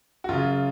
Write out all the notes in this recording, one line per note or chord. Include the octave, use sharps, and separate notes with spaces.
F#4
F#2 C#3 F4